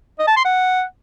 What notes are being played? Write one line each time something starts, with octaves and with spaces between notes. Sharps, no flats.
D#5
A5
C6
F#5